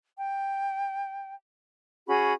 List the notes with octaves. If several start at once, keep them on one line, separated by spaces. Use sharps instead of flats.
G5
C#4 F#4 G#4 B5